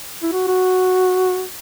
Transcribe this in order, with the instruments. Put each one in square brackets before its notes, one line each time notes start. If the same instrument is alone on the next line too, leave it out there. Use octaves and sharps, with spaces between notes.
[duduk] E4
F#4
F#4